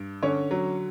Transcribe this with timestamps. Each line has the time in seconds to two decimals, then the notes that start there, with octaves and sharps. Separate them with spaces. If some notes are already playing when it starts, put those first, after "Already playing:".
Already playing: G2
0.22 D3 C#4 C#5
0.51 F#3